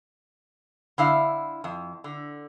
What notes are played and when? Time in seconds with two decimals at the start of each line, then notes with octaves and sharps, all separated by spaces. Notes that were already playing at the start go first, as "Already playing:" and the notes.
0.98 D3 E4 F5
1.64 F2
2.04 D3